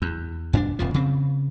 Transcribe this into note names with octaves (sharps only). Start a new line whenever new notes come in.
E2
G2 C#4 D4
D#1 F2 F3
C#3 C4